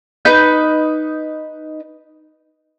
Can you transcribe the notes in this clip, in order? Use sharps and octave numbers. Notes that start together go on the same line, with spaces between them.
D#4 B4 G6